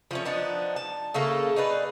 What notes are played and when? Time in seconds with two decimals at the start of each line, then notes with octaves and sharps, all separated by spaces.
0.11 F3 A3 C#4
0.25 F3 B3 D4 D#4
0.76 A5
1.14 C#3 A3 A#3 A4
1.56 D#4 G#4 B4 D5